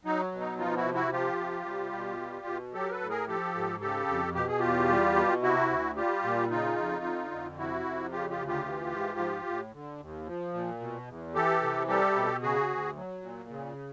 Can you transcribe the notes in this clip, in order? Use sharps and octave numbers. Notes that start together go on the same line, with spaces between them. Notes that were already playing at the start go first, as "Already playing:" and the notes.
F#3 D#4
B2
D#4
F3 D#4 F4
E4 F#4
C3
E4 F#4
F3 F4 G4
C3
G3
B2
G3
B2
F#3 G4 A4
A#4
A4 B4
A2
G#4 A#4
F3 G4 A4
G#2
C#3 G4 A4
F2
B2 G4
G#4
E2 F4 G4
G3
B2
C3 E4 F#4
D2
G3 F4 G4
A#2
C#3 D#4 F4
F2
D3
F2
C3 E4 F#4
F2
C#3 F4 G4
F4 G4
D2
F4 G4
E3
G#2
F3
A2
D3
D#2
F3
A#2
B2
E2
E3 G4 A4
C3
G3 G4 A4
B2
C#3 F#4 G#4
D2
F#3
A#2
C#3